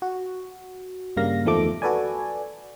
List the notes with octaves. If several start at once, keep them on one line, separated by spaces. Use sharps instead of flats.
F#4
G2 C#3 G3 A#3 F5 A#6
E2 D#3 F3 A3 A4 D6
F#4 A4 B4 D5 G#5